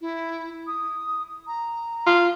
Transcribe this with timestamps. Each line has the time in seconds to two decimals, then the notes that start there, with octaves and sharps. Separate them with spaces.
0.01 E4
0.67 D#6
1.47 A#5
2.07 F4